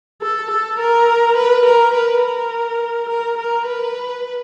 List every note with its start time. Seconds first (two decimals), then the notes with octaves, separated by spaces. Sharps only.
0.22 A4
0.51 A4
0.79 A#4
1.37 B4
1.66 A#4
1.93 B4
2.23 A#4
3.09 A#4
3.38 A#4
3.66 B4